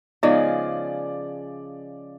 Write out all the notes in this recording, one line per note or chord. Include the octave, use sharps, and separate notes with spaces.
C#3 F3 G#3 B3 D#4 D5